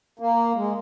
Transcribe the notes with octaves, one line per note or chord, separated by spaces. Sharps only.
A#3
G#3